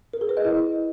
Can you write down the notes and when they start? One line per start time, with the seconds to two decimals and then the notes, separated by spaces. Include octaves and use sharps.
0.13 A#4
0.21 G#4
0.29 B4
0.37 D#5
0.45 E4